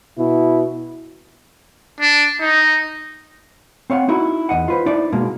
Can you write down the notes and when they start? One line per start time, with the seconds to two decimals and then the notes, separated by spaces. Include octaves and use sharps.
0.18 B2 E4
2.00 D4
2.41 D#4
3.90 C4 C#5 F5 F#5
4.09 D#4 E4 F#4
4.49 E2 G2 D#5 F#5
4.68 F4 B4 C5
4.86 D#4 E4 D5
5.12 B2 G#3 A#3